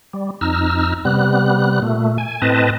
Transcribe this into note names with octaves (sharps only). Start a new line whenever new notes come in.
G3
F2 D#4 E6 F6
C3 G3 B3 F#6
A#2 A3
G#5
A2 C4 B4 D#5 A5